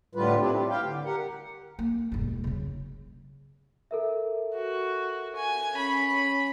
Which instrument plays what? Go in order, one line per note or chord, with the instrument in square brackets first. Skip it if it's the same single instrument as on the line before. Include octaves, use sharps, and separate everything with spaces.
[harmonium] A2 D3 G3 F4 B4
F3 C4 D4 E4 G4
G3
G4 F5 G5
D3
G4 A#4 F#5
[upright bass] A#3
E1 G2
C#3 F#3
[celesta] A4 A#4 E5
[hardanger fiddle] F#4
G#5
C#4 B5